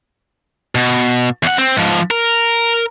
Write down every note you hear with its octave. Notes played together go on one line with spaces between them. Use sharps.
B2
E2 F#5
C4
G#2 F3
A#4